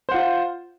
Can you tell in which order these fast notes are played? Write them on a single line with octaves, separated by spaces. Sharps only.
C5 F#5 F4